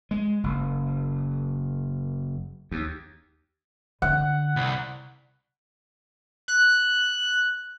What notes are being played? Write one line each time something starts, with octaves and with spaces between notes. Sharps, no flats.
G#3
F#1
D#2
D3 F#5
C2
F#6